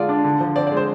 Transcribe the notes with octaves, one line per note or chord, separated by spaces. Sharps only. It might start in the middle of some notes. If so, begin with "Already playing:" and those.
Already playing: D3 G#3 F4 D5
D4
D3
F3
C4 D5
D5
G#3
C5